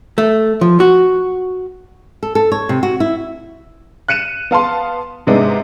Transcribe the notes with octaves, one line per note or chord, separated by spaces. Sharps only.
A3
F3
F#4
A4
A4
C#5
C3
F#4
E4
F#6 C#7 D#7 E7
B3 F5 A5 C6
G#2 C3 G#3 B3 D4 D#4